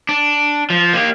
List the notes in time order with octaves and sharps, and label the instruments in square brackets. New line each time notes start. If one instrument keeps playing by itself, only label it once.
[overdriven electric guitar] D4
F3
A#3 G4